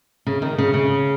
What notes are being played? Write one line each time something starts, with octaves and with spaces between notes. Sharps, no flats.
C#3
D#3
C#3
C#3